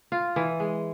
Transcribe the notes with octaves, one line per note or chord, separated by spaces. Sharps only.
F4
E3
G#3